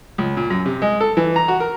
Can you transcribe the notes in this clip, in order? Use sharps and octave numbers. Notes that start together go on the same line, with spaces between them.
C#2
A#2
F#2
C3
G#3
A4
E3
A#5
F#4
A#4